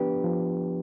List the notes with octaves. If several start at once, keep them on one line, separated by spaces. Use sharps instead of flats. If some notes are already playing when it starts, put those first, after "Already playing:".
Already playing: F3 B3 D4 G4 B4
F3